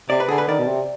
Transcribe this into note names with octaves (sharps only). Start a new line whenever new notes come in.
C3 D5
B4
D3 G#4
B4
D#3 D5
B2
C3